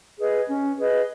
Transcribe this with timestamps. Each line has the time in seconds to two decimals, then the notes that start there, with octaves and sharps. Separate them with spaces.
0.18 G#4 B4 D#5
0.49 C#4
0.78 G#4 B4 D#5